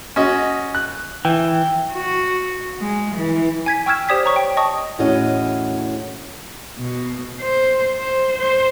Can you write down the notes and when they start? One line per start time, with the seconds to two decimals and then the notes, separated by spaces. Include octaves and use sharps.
0.16 C#4 F#4 D#5
0.75 F#6
1.25 E3 G5
1.93 F#4
2.80 G#3
3.16 E3
3.66 G#5 G#6 B6
3.86 G5 C#6 E6 F6 G#6 E7
4.09 G4 C5 D5 D#6 G#6 B6
4.23 C#5 D5 A#5 C#6
4.36 G5
4.57 D#5 A5 C#6 D#6
4.99 E2 A2 C#4 D4 F#4 D#5
6.78 B2
7.42 C5
8.00 C5
8.39 C5